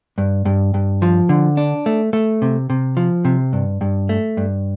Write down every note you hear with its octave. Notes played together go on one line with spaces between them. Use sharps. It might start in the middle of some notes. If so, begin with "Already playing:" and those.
G2
G2
G2
F3
D3
D4
A3
A3
C3
C3
F3
C3
G2
G2
A3
G2